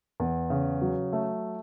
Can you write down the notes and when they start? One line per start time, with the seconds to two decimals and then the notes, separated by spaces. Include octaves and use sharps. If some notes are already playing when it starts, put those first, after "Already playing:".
0.20 E2
0.50 C#3
0.82 F#3
1.13 A3